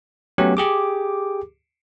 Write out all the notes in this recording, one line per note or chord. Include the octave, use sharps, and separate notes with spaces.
F#3 A3 B3 C#4 G4
G4 G#4 D6